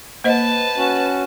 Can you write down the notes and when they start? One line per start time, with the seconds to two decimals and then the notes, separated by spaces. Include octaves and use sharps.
0.24 A#3 B4 C5 D#5 A5
0.77 C#4 F#4